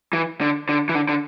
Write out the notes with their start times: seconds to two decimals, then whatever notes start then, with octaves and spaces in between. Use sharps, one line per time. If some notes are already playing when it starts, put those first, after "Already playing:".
0.13 E3
0.41 D3
0.69 D3
0.89 E3
0.95 D3
1.09 D3